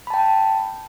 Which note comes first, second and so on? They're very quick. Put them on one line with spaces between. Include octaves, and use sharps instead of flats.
B5 A5 G5